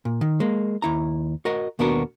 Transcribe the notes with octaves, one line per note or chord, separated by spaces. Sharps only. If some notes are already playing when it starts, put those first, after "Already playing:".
A#2
D#3
G#3 A#3
D#2 E4 A#5
F#4 A#4 D#5
D#2 B2 B3 D4 F#4 A#4